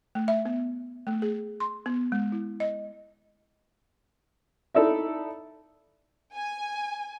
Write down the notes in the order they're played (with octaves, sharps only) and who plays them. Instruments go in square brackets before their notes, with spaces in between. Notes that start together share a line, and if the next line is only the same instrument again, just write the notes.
[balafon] A3
E5
B3
A3
G#4
C6
B3
G#3
E4
D#5
[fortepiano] D#4 E4 A4 D5 E5
[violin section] G#5